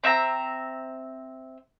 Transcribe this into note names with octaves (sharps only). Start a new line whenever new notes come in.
C4 E5 F#5 A#5